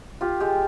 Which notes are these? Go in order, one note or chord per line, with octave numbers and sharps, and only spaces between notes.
F4 G4
G#3 G4